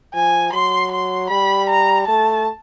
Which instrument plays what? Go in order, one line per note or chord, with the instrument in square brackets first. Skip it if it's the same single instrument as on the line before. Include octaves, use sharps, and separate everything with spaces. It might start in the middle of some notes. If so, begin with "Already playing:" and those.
[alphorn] F3 [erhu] G#5
[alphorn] F#3 [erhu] C6
[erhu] C6
[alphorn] G3 [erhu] B5
[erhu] A#5
[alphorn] A3 [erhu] A5